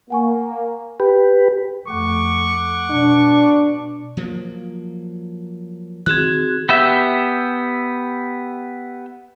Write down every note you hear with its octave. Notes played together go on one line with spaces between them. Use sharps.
A#3 F#5 G#5 C#6
G4 B4
F2 A3 F#5 C#6 D6
B2 D4
F3 F#3 A#3
D#3 C4 F#4 G#4 F#6 G#6
B3 G4 E5